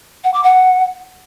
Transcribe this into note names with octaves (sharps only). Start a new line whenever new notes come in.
F#5
D6
F#5